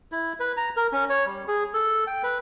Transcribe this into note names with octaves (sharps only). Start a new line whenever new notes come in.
E4
B4
A#5
A#4
C#4
C#5
G3
G#4
A4
G5
B4